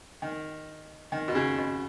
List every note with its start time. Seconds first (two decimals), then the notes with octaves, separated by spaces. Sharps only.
0.22 D#3
1.12 D#3
1.28 B2
1.35 C#3
1.57 B2